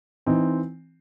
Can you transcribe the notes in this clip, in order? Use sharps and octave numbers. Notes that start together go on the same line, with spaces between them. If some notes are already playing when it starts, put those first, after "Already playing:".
E3 C4 D#4